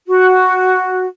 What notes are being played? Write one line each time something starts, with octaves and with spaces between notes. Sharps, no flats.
F#4